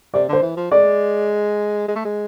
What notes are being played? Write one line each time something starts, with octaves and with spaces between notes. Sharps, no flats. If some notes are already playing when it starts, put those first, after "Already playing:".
C3 D5
D3 C5
E3
F3
G#3 D5
G#3
A3
G#3